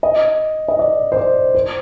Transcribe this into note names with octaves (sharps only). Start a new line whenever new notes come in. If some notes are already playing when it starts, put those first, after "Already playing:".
D#5
D#5
D5
C5
D5
C5